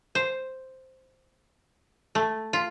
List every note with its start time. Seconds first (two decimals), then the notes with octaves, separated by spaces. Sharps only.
0.15 C5
2.15 A3
2.53 F4